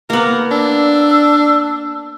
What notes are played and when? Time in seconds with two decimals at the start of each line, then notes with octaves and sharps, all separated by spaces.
0.10 A#3 B3 A#4
0.51 D4 E6